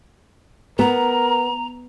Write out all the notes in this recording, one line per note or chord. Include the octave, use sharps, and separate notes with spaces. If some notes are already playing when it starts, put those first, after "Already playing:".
B3 A#4 A#5